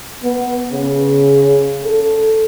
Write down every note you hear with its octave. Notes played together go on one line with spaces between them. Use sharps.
B3
C#3
A4